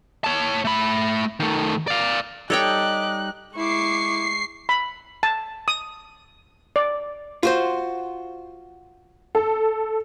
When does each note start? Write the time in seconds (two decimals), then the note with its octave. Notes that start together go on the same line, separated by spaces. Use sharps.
0.24 C#5 A5
0.65 A3 B5
1.40 D#3 A3
1.88 D5 F5
2.50 G3 D#4 G4 A4 C#5 D#5 G5 F#6
3.56 G#3 E4 C#6 D6 C7
4.69 B5
5.23 A5
5.68 D#6
6.76 D5
7.43 F4 F#4 C5
9.35 A4